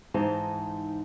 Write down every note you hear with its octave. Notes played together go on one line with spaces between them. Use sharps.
G#2 E3 D#4 C5 A5 A#5